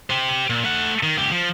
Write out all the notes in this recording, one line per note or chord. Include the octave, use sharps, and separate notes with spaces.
G4 C5
A#2
A3 F#5
D#3
C#2 G4
F3